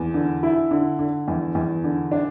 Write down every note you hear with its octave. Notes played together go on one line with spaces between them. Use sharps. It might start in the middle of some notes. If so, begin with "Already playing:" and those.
Already playing: E2
D3
E4
D3
D3
E2
E2
D3
D4